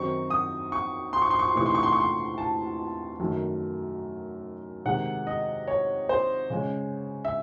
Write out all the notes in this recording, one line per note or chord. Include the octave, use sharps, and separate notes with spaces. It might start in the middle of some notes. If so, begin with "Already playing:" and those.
Already playing: F#2 D#3 F#3 C4 D#4 C#6
D#6
C#6
C6
C#6
C6
C#6
C6
C3 E3 A3 D#4 C#6
C6
C#6
C6
C#6
C6
A5
F#2 D#3 A3
C3 D#3 G#3 D#4 F#5
D#5
C#5
C5
C#3 G#3 C#4
E5